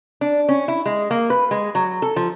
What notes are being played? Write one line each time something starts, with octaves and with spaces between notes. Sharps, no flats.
D4
C#4
E4
G#3
A#3
B4
G#3
F#3
A4
F3